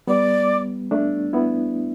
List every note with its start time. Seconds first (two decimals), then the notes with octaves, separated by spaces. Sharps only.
0.08 G3 B3 D5
0.91 A3 D4
1.33 B3 E4